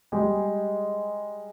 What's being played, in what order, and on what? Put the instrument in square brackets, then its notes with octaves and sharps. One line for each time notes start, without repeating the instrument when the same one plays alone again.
[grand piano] G3 G#3 G4 G#4